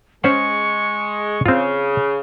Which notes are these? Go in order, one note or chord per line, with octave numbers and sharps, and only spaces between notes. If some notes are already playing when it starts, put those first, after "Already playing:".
G#3 C#4 C5 F#5 C#6
C#3 C4 F4